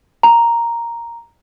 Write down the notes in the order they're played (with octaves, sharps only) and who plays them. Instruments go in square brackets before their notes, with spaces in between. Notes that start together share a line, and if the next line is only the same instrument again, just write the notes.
[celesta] A#5